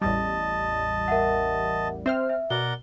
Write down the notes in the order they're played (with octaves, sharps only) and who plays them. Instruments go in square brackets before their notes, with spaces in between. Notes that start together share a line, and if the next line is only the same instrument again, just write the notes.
[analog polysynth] A1 E2 G3 [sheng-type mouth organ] D#5 A5
[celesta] A#4 E5 F#5
[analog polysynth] C4 C5 F6 [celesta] E5
[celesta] E5
[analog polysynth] B2 [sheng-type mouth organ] A#4 D5 F#5 [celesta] G7